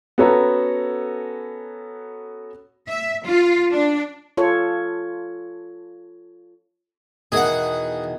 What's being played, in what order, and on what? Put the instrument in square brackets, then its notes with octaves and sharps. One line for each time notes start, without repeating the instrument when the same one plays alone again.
[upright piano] B3 C#4 F#4 A4 C#5 A#5
[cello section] E5
F4
D4
[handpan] F4 A4 C#5
[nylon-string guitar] E2 B2 D#3 [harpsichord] G#4 F#5